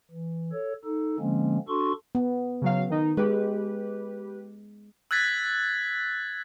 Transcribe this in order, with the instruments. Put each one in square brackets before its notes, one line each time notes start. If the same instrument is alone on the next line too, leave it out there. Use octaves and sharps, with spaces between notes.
[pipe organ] E3
A4 C#5
D#4 A4
D3 F3 G#3 A#3 C4 C#4
D4 F#4 A4 C6 C#6
[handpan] B3
[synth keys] C#3 F#3 F5
D#3 D#4
[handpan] G#3 [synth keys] G4 B4
[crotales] E6 F#6 G#6 A6 B6